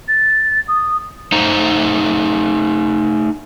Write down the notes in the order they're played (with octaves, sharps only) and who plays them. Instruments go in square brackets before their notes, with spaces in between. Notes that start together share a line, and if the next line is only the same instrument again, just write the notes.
[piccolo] A6
D#6
[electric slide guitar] A3 D#4 C5 A#5